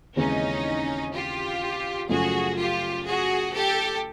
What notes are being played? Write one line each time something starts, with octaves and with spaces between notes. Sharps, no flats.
D#2 C#3 E3 G#3 C4 C#4 D#4
F4 G4
F#2 C#3 F3 A3 C#4 F#4 G#4
F4 G4
F#4 G#4
G4 A4